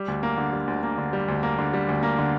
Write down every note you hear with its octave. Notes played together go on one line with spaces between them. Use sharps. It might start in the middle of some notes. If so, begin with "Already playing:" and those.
Already playing: G3
D2
A#3
D3
G3
D2
A#3
D3
G3
D2
A#3
D3
G3
D2
A#3
D3